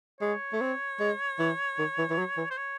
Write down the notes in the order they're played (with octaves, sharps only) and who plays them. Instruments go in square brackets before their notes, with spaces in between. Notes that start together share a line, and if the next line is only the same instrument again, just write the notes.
[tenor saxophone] G#3 [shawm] C#5
[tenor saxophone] A3
C4
G#3
E3
D#3
E3
E3
F#3
E3
[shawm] C5
C#5